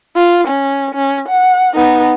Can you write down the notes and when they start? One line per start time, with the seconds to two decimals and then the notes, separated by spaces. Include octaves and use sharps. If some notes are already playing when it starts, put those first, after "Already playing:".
0.16 F4
0.47 C#4
0.95 C#4
1.29 F#5
1.76 B3 D#4